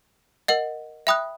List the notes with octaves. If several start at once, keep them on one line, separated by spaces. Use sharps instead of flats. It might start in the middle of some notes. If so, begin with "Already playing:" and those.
A#4 D#5 F#5
E5 G5 B5 D#6 F#6